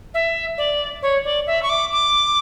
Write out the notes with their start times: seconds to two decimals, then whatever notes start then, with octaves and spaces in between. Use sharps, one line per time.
0.14 E5
0.58 D5
1.02 C#5
1.24 D5
1.47 E5
1.63 C#6
1.69 D6
1.92 D6